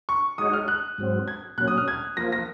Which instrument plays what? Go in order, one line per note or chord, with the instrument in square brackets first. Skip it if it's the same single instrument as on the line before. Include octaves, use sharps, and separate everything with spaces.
[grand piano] C#6
[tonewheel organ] G#3 D#4 F#4 C#5 [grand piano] D#6
[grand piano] F6
F#6
[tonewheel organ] G#2 F#3 C4
[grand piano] G#6
[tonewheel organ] A#2 F#3 C#4 [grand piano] F#6
[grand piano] D#6
F6
G#6
[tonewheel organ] F3 A#3 F4 [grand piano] A#6
[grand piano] A#6